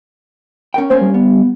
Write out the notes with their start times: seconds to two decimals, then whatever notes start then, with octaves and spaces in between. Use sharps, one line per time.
0.74 C#4 A#4 G5
0.90 A3 A#3 C#4 C5
1.01 G3
1.14 B3